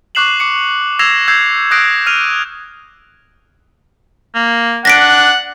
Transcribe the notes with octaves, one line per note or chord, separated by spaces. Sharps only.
C#6 D6 F#6 C7 E7 F#7
D6 C#7
E6 G#6 A#6 C7 E7 F7
E6 G6 G#6 C7
D#6 F#6 G6 A#6 C7 D7
F6 D#7 F7
A#3
D4 F#5 A#6 B6 D7